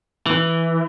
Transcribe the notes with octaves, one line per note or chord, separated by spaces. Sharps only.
E3